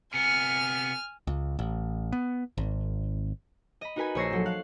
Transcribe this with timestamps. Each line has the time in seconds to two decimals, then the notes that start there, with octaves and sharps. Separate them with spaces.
0.14 C3 B3 G#5 F6
1.27 C#2
1.59 A1
2.12 B3
2.58 G#1
3.81 D#5 B5
3.96 D#4 F#4 A#4 B4 G#5 B5
4.15 A#1 C#5 C#6 E6 A#6 C7
4.31 F3 F#3 A4
4.46 F5 F#6